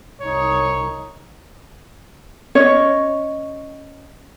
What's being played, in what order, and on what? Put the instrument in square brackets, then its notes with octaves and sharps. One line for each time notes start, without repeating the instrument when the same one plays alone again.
[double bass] C2 D#4 [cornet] C#5
[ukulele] C#4 C#5 D#5